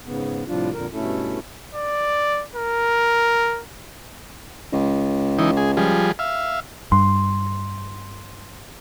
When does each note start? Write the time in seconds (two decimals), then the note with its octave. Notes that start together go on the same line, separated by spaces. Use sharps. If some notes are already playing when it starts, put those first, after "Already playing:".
0.05 G#2 C#3 B3
0.48 A2 C3 F3 G3 D4 F4
0.73 F2 A#2 D3 A#4
0.93 G2 B2 A3 C#4 E4 A4
1.75 D5
2.55 A#4
4.73 C#2
5.39 E3 D#4
5.57 G#4
5.77 F3 G3 G#4
6.19 E5 F5
6.92 G2 C6